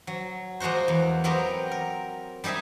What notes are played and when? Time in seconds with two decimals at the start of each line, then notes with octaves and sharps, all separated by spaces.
0.07 F#3
0.60 F3 G#3 A#3 F#4 C5
0.88 E2
1.24 F#3 B3 C4 G4 A#4
1.72 A#4
2.44 G3 D#4 G#4 E5 G#5